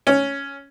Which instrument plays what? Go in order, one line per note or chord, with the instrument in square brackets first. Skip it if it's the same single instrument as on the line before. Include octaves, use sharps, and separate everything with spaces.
[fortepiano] C#4